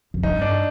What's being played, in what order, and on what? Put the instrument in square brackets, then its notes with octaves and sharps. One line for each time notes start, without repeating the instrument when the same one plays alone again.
[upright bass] F2
[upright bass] G2 [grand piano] D#4
[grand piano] D4